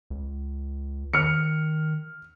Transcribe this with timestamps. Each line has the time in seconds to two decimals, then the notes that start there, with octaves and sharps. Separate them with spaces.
0.10 C#2
1.13 D#3 F6 C#7